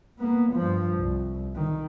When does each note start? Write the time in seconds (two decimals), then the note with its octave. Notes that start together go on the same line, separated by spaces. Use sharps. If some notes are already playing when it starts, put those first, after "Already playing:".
0.19 A#3 B3
0.53 G2 F3
0.99 C2
1.55 D#3